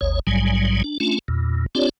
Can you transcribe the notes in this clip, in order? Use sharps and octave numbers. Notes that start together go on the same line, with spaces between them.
G#1 D#2 C#5
A#1 G#2 F#3 G3 G#5
D4
A3 C#4 D4 F4
E2 A#2
C4 D4 F4 G4 C#5 D5